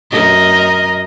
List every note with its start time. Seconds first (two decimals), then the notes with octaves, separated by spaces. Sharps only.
0.11 F#2 A#4 D#5